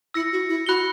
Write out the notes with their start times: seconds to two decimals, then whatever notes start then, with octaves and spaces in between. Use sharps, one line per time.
0.14 E4 E6 A#6 C#7
0.32 F#4
0.49 E4
0.66 F#4 B5 F#6 C#7 G7